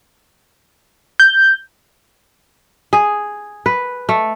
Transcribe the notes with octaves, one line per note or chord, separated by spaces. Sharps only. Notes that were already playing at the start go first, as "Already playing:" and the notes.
G6
G#4
B4
A3